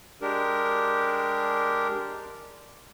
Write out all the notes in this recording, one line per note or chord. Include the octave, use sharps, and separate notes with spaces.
G#3 D4 G4 A#4